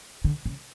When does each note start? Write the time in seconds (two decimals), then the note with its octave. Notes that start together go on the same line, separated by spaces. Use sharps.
0.24 D3
0.46 C#3